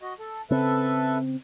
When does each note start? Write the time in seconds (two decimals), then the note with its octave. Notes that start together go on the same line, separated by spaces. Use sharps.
0.01 F#4 D#5
0.19 A4
0.50 C#3 C4 A4 B4 E5